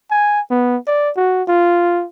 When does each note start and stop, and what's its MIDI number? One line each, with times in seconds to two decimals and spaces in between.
0.11 0.41 80
0.50 0.77 59
0.87 1.11 74
1.17 1.43 66
1.48 2.06 65